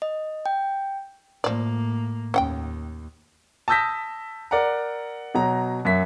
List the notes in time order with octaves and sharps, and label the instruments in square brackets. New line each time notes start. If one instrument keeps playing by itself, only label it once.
[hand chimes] D#5
G5
[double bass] A2 A#3 [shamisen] F3 D5
[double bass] D#2 [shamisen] C#4 F#5 G5
[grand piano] A5 D#6 E6 G6 A#6 B6
A#4 D5 F#5 A#5
B2 F#3 A#5
F#2 E5 B6